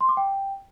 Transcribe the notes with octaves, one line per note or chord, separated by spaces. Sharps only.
C6
D6
G5